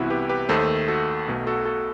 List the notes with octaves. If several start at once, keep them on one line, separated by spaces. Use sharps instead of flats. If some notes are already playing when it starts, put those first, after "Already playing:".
Already playing: C2 C3 E3 B3 E4 F#4
G4 B4
G4 B4
D#2 D#3 A3 A4 C5
F#4 A4
B1 B2 A3
F#4 A4
F#4 A4